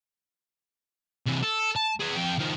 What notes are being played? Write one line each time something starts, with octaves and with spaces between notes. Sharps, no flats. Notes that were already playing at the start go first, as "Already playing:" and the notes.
C3 E3
A4
A5
G#4 B4
F2 G5
D#3 F3